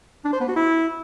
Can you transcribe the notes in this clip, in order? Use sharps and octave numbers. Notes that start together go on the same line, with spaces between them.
D4
C5
B3
F#4
E4